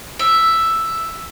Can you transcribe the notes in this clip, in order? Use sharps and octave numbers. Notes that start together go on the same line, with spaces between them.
E5